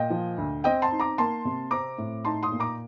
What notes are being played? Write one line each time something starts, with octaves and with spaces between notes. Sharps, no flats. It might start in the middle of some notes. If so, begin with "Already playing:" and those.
Already playing: A#2 D#5 G5
F3
D2
C4 D#5 G5
A5 C6
D#4
A#5 D6
A#3 A5 C6
C3
C4 A#5 D6
A2
D#4 A5 C6
C6 D#6
A#2
A#5 D6